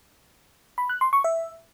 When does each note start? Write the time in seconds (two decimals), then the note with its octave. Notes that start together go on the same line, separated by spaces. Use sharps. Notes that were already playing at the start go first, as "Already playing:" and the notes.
0.78 B5
0.89 F#6
1.01 C6
1.13 C#6
1.24 E5